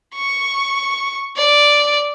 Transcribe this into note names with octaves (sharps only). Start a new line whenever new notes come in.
C#6
D5